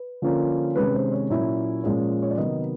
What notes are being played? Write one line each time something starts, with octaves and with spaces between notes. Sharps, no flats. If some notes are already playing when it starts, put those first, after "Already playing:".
Already playing: B4
D3 F3 A#3 C#4 F4
C3 D#3 G#3 C#4 B4
C5
C#5
A#2 F#3 A#3 C#4 E4
A#2 F3 G#3 C#4 F4
C#5
D5
C3 D#3 F#3 B3 D#5